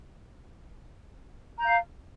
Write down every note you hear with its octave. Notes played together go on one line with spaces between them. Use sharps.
F5 A#5 G6